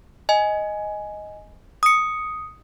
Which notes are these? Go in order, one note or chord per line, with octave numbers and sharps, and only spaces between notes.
D#5 G#5
D#6 C#7